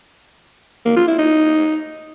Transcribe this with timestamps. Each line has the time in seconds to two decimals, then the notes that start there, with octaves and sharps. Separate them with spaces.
0.85 A#3
0.96 F4
1.07 E4
1.18 D#4